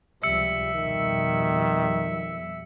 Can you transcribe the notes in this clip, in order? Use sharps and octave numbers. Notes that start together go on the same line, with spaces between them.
C#2 C3 F3 G3 E5 E6 C#7
F2 B2 D#3 G3